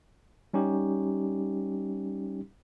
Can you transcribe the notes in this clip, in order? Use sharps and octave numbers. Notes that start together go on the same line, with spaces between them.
G3 C#4 D#4 G4